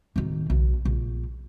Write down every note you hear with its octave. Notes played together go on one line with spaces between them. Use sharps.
D1 D#3
B1
A#1